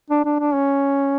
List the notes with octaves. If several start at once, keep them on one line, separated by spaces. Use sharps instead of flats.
D4
D4
D4
C#4